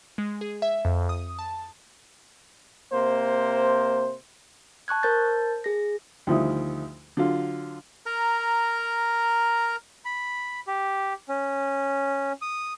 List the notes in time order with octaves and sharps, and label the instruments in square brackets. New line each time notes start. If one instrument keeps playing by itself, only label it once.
[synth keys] G#3
G#4
E5
F2
D#6
A5
[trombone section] C3 A#3 C5
[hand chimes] A5 C#6 F#6 G#6
A#4 C5 A5 G6 A6
G#4 A#6
[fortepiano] D2 D#3 F3 G3 E4 D#6
D3 F#3 F4
[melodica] A#4 A#5
[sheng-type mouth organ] B5
G4
C#4
D#6